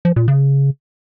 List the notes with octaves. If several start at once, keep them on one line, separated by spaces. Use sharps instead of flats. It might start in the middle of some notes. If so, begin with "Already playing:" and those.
F3
A#2
C#3